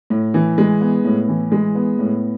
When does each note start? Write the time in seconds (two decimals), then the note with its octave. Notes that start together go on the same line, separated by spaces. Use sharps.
0.10 A2
0.34 E3
0.58 G#3
0.81 B3
1.05 A2
1.29 E3
1.52 G#3
1.75 B3
1.99 A2